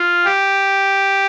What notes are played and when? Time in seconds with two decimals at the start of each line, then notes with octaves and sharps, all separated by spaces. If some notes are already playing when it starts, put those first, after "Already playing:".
Already playing: F4
0.25 G4